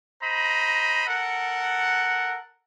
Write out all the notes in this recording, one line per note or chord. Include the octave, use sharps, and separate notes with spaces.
C5 D#5 A#5 B5
A4 A#4 F#5